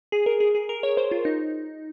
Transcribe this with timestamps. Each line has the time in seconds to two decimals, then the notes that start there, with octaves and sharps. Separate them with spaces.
0.12 G#4
0.26 A#4
0.40 G#4
0.55 G#4
0.69 A#4
0.83 C#5
0.97 C5
1.11 F4
1.25 D#4